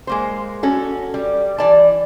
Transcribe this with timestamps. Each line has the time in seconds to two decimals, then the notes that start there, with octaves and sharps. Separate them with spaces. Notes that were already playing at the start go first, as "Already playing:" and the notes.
0.07 G#3 A#3 C5
0.63 C#4 F#4 A4
1.14 G3
1.58 E3 D5 A5